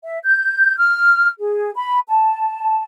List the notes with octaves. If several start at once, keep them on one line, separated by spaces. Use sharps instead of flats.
E5
G6
F6
G#4
B5
A5